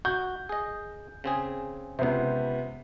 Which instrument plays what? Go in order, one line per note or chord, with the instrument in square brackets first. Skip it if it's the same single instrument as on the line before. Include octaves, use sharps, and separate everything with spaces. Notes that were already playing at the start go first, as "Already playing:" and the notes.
[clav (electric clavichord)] F#4 [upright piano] G6
[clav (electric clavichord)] G#4 D#5
C#3 C4 G#4
[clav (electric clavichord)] C#2 C5 [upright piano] C3 B3